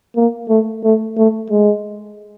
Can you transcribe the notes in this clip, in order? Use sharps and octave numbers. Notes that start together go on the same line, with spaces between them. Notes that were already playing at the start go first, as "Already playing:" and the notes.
A#3
A3
A3
A3
G#3